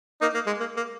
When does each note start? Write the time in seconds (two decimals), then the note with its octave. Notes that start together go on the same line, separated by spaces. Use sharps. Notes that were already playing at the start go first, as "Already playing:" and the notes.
0.21 A#3 D#4
0.34 A#3
0.46 G#3
0.60 A#3
0.77 A#3